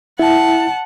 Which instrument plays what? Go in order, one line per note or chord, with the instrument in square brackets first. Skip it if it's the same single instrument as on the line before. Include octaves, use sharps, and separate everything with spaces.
[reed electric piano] E4 [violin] F#5 A5